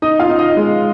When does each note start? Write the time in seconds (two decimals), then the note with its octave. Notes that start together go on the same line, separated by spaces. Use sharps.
0.02 D#4 D#5
0.20 F4 F5
0.29 D#4
0.39 D#5
0.57 G#3